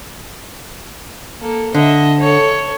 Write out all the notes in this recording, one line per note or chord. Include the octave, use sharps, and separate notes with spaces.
A#3 A4
D3 D#5 E5
A4 C#5